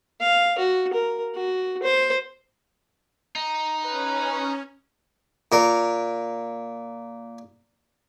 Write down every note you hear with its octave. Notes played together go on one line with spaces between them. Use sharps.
F5
F#4
A#4
F#4
C5
D#4
C#4 B4
A#2 A#4